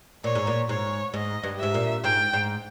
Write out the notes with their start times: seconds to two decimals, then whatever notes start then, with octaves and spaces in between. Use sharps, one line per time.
0.24 A#2 C#5
0.35 G#2
0.47 A#2
0.69 G#2 C#5
1.14 G#2 D#5
1.43 G2
1.59 G#2 E5
1.74 A#2
2.04 G#2 G5
2.33 G#2